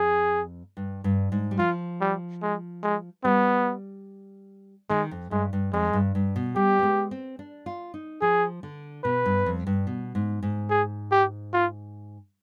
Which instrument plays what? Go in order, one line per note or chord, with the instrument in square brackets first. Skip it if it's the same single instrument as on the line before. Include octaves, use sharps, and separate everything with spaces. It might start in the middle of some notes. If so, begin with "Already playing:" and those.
Already playing: [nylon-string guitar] F2 [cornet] G#4
[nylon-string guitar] G2
G2
G#2
G3
[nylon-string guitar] F3 [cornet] F4
[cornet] G3
G#3
G#3
[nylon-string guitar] G3 [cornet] B3
[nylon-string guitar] D#3 [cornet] G#3
[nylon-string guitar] F2
[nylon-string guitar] G2 [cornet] G#3
[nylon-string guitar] G2
[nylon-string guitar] F2 [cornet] G#3
[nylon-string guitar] G2
G2
B2
[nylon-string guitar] G3 [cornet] G4
[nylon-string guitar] B3
G#3
C4
D4
F4
D#4
[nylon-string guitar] F3 [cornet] G#4
[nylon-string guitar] D3
[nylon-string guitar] B2 [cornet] B4
[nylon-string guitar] G2
F2
G2
B2
G#2
G#2
[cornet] G#4
G4
F4